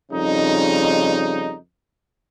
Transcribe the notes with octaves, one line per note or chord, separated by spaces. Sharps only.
F2 C#3 G3 D#4